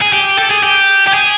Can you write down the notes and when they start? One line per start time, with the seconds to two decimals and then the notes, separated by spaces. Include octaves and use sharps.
0.01 G#4
0.12 G4
0.38 A4
0.51 G#4
0.64 G4
1.07 G4
1.13 G#4